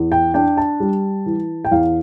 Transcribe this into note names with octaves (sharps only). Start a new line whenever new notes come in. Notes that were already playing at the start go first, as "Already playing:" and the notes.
Already playing: E2
G5
D4 G5
A5
G3
E3
G5
E2 F5